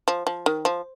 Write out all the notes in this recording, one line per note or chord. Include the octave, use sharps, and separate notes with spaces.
F3
F3
D#3
F3